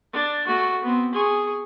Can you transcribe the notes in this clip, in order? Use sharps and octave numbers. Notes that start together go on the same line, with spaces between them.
D4
A3 F#4
B3 C4
G#4 C#6